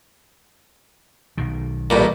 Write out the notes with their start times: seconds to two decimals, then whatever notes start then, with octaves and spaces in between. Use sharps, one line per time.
1.37 B1 B2 D#3
1.90 A1 G2 A#2